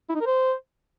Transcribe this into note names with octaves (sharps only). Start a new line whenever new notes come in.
E4
D#4
A#4
C5